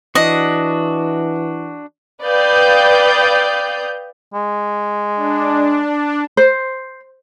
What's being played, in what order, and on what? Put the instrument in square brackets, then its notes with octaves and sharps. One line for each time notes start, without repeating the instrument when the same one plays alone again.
[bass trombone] E3 [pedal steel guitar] D4 F#4 [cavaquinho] D#5
[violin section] B4 D5 F5 G5 D#6 G6
[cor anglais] G#3
[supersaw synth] D4
[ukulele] C5